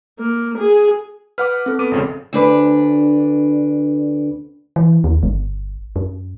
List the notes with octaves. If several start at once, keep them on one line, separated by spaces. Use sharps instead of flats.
A#3
G#4
B4 F#5 D6 F6
C4 A4
B3 D6 D#7
G#1 F2 C#3
D2 D4 B4
E3
D#2
G1
F#2